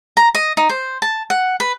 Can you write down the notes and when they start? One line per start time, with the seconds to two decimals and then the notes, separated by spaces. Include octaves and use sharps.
0.17 A#5
0.35 D#5
0.57 D#4
0.69 C5
1.02 A5
1.30 F#5
1.60 B4